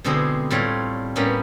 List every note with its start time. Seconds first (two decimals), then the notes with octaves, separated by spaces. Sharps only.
0.04 B2 D3 G#3 C4 E4 G#4
0.50 A2 G3 C4 F4 C#5
1.16 A2 G3 A#3 B3 C#4